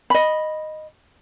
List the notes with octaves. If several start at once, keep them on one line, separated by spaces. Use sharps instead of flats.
D#5 B5